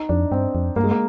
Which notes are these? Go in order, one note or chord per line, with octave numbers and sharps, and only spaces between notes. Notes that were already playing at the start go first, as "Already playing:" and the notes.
Already playing: D#4
F2 D4
G2 C4
F2
G2 A#3
G#3
A#3